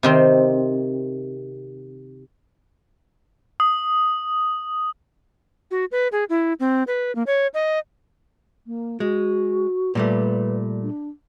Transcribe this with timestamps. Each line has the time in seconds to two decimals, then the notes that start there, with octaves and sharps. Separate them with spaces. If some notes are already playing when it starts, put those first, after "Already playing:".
0.03 C3 D#3 C4
3.60 D#6
5.71 F#4
5.92 B4
6.12 G#4
6.29 E4
6.60 C4
6.87 B4
7.15 A#3
7.27 C#5
7.54 D#5
8.67 A#3
9.00 G#3 F#4
9.95 A#2 G3 A3 B4
10.83 D4